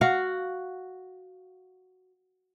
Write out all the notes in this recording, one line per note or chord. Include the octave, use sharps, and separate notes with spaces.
F#4 F5 F#5